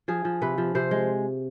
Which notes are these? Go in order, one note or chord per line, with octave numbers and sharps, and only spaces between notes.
F3 G#4
F3
C3 B4
F3
C3 C5
G#3